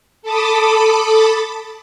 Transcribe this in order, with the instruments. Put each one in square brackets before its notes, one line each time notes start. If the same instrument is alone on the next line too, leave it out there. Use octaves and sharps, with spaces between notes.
[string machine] A4 A5 B5 D6 D#6 A6